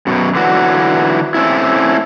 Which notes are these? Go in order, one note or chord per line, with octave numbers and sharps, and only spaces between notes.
F#2 B2
D3 E3 F#3 F#4
A3 C4 C#4 E4